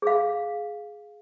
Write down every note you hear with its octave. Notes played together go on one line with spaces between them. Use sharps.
G#4 F5